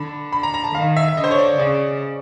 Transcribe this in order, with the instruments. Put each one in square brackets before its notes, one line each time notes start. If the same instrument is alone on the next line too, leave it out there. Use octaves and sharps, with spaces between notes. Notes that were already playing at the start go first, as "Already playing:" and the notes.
Already playing: [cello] D3 [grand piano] B5
[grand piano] B5
A#5
A#5
A5
[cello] D#3 [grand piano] F5
[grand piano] E5
E5
[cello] D3 [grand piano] D#5
[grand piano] C5
C#5
D5
[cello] C#3 [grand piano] D5